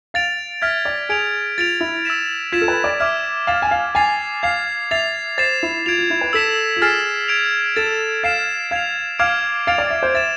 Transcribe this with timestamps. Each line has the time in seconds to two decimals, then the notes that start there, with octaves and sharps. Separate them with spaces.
0.14 F5 A6 D7 F7
0.62 E5 F6 G#6 B6
0.85 D5
1.09 G#4 G#6 D7 F7
1.58 F4 A6 D7 F7
1.81 E4
2.05 E6 B6 E7
2.52 F4 G#6 B6 E7
2.62 A4
2.68 B4
2.84 D5
3.00 E5 D6 F6 G#6
3.47 F5 A6 E7
3.62 G#5
3.71 F5
3.95 G#5 A6 C7 F7
4.43 F5 G#6 C7 F7
4.91 E5 A6 C7 F7
5.38 C5 A6 C7 E7
5.63 E4
5.86 F4 G#6 D7 F7
5.98 F4
6.10 E4
6.21 B4
6.33 A4 E6 B6 E7
6.76 F4
6.82 G#4 F6 A6 C7 E7
7.28 G#6 D7 F7
7.76 A4 A6 E7
8.23 F5 G#6 C7 E7
8.71 F5 G#6 C7 F7
9.19 F5 D6 F6 G#6 D7 F7
9.67 F5 A6 D7 F7
9.78 D5
9.90 E5
10.03 C5
10.14 E5 A6 E7